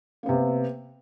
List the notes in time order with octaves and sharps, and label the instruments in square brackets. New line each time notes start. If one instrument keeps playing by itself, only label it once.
[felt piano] A#3
B3
C3